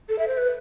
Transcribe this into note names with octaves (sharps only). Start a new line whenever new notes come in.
A4
E5
C5
B4